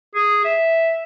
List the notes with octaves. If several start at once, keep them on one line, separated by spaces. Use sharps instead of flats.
G#4
E5